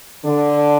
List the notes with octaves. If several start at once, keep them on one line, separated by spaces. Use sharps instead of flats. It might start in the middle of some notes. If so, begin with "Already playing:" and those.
D3 D4